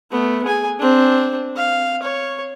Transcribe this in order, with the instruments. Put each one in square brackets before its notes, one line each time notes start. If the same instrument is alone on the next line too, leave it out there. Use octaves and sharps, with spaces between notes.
[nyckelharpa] A3 B3
G#4 G#5
C4 D4
F5
C#5